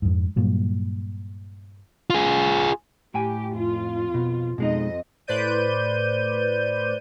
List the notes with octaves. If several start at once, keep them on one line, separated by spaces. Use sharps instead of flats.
F2 G#2
G2 A#2 F#3
F4 G#4
A2 G4 G5 G#5
F2 F4
B2
F2 B2 G#3 D#4 D#5
A2 B4 C5 D5 G6 D#7